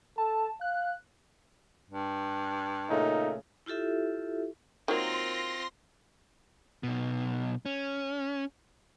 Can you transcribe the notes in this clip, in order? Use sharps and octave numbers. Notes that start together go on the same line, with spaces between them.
A4 A5
F5 F#6
G2
A#2 C#3 A3 D#4
E4 F4 G4 A4 E5
D#3 F#3 A#3 C4 F4 C6 A#6
B1 B2
C#4